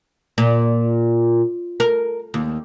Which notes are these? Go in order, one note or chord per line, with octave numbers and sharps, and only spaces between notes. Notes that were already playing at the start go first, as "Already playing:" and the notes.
A#2
A#4
D#2